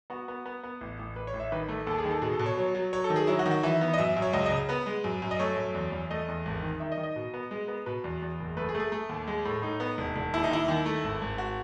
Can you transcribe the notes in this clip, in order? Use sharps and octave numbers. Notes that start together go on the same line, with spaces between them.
B3 F#4
B3
B3
B3
A1
A1
A1 B4
C#5
A1
E5
D#3 B4
A3
D#2 A4
G#4
D#3
A4
B2 G#4
A4
B2
C#5
F#3
F#3
F#3 C#5
A4
D#3
G#4
F#3 E4
F#4
D#3
F#4
E3 E5
B3
D#5
F#2 E5
F#2
C#5
C#2 D#5
C#3 D#5
B3 B4
G#3
F#2
F#2
D#5
A3 C#5
F#2
E2
E2
A3 D#5
E2
G#1
D#3
D#3 E5
D#5
D#3
D#5
B2
B3
G#3
B3
B2 B4
E2
E2
F#1
A3 B4
G#4
A3
G#4
A3
D#2
G#3
A2
A2 D#4
B3
E1
E1
D#2 E4
D#4
D#2 E4
D#3
A3
G#1
G#1
F#4